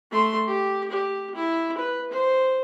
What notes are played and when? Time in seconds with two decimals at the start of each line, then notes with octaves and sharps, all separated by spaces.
0.11 A3 C6
0.47 G4
0.91 G4
1.35 E4
1.77 B4
2.11 C5